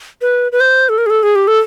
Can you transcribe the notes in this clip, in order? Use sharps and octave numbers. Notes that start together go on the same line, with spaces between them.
B4
B4
C5
A4
A#4
G#4
A4
G#4
G4
A4